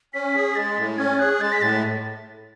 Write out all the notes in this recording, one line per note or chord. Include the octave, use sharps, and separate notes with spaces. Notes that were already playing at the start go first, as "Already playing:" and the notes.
C#4 B6
G#4
G#3 A6
A2
C#4 G#6
G#4 F#6
G#3 A6
B6
A2 A6